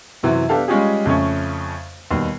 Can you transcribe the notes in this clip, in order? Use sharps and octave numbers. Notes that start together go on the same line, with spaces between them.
F#2 C3 E3 F#3
B3 D4 G4 A4 F5
G3 G#3 C#4 F4 G4 G#4
F2 C#3 A3 C#4
D#2 B2 G3